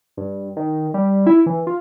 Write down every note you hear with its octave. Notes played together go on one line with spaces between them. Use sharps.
G2
D#3
G3
E4
E3
F4